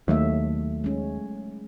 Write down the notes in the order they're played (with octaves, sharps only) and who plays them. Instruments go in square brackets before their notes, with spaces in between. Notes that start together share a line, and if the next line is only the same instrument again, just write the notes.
[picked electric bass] D#2 [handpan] F#3 A3 E5
[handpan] G#3 C#4